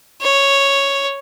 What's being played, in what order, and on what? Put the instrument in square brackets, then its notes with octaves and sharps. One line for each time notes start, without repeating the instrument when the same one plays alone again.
[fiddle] C#5